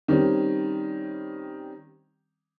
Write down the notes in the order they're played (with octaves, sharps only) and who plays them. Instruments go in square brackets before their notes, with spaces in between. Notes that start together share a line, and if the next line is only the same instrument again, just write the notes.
[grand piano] D#3 G3 C4 C#4